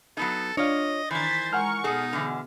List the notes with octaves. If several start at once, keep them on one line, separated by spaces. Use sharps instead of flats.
F#3 B3 D#4 A4
D4 F4 C#5 D#5
D#3 E3 C5 G#6 A6 B6
G#3 A#4 F#5 G#5 C#6 F6
B2 G#3 D#4 G#4 A4
D3 E3